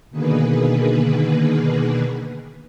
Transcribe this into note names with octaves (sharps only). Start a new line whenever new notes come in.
B2 D3 D#3 A#3 G#4 B4